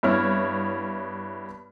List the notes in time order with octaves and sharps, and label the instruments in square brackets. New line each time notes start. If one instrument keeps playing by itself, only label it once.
[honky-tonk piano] G2 B3 E4 C#5 F6